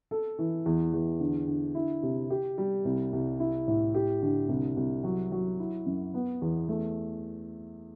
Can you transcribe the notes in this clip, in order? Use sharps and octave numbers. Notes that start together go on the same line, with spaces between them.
A4
E3
E2
E2
D3
D3
E4
C3
G4
G3
C2
C2
E4
A2
G4
D3
C2
C2
F#3
F#3
E4
F#2
B3
E2
A3